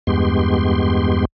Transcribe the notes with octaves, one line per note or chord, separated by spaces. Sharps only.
E2 G2 G#3 B3 G4 C6